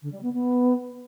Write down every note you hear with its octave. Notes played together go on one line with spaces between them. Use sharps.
D3
G3
B3
B3